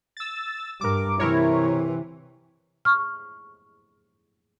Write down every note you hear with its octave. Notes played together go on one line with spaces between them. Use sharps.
E6 A6
G2 A#4 D6
C3 E3 E4 A#4 C#5
C#6 F6